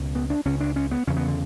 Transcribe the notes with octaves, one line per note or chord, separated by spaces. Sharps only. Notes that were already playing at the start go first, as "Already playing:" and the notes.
Already playing: C#2 B2
B3
D4
C#2 C#3 C#4
D4
C#4
B3
E2 C#3 C#4
B3
D3